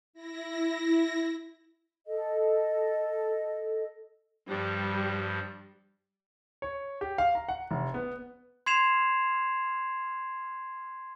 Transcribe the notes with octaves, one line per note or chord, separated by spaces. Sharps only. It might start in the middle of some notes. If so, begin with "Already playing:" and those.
E4 A#6
A4 D#5
G2 F3 G3
C#5
G4
F5
A#5
F#5
F1
B3
C6 G#6 C7 E7 F7